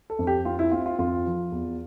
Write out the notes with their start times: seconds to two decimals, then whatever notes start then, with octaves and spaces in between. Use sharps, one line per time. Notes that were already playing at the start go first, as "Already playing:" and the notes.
0.10 A4
0.19 F2
0.27 G4
0.45 C4 F4
0.59 E4
0.71 C4 F4
0.86 F4
0.99 F2 F4
1.26 F3
1.52 E2